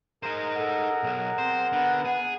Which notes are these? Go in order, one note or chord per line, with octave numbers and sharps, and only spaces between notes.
D#4 G#4 A#4 C5 A#5
A4 F#5
B1
C4 C5
D3 B3
G#4